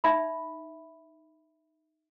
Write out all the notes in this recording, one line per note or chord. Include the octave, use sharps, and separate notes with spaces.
D#4 E5 B5